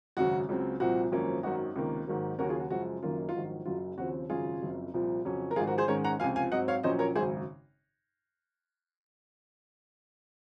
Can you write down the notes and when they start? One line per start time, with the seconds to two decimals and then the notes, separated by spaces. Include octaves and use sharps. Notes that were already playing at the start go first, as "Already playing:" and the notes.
0.17 G#1 F#2 C#3 F#4
0.49 C#2 C#3 F#3 C4
0.80 C2 A#2 F3 C4 F#4
1.12 G#1 F#2 F3 A#3 C#4
1.43 G#1 F#2 D#3 F#3 F#4
1.76 C#2 C3 D#3 A#3
2.07 G#2 D#3 F#3 A#3
2.38 D#2 C#3 F#3 A#3 C#4 F#4 A#4
2.49 F4 G#4
2.60 F#4
2.70 F#2 C#3 F3 G#3 F#4
3.03 F#1 F#2 D#3 A#3 C#4 F4
3.29 F4
3.35 A#1 G#2 D#3 F#3
3.65 F#1 F#2 C#3 F#3 F4
3.97 D#2 C#3 F3 C4 F#4
4.29 G#1 F#2 C#3 F4 G#4
4.62 F#1 F#2 F3 C4
4.94 C2 A#2 F3
5.25 F2 C#3 F#3 C#4
5.51 A#4
5.56 G#1 G#2 F3 F4 G#4
5.67 F#4 A#4
5.78 G#4 C5
5.88 G#2 D#3 G#3 C#4 A#4 C#5
6.04 F#5 A#5
6.20 C#2 C3 F3 F5 G#5
6.36 F5 G#5
6.52 G#2 F#3 C4 D#5 F#5
6.68 C#5 F5
6.83 A#1 A#2 F#3 C#4 C5 D#5
6.99 A#4 C#5
7.15 G#1 F#2 C#3 G#4 C5